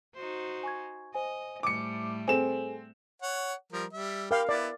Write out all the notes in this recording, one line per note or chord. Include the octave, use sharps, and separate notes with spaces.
D#4 F#4 C5
G#5 C#6 G#6
C5 D#5 G#5
A2 G3 A3 D6 C#7
C4 G#4 A4 G#5 E7
C#5 F#5
F3 G3 A#4
G3 E5
G4 A#4 F5 G5 B5
B3 E4 D5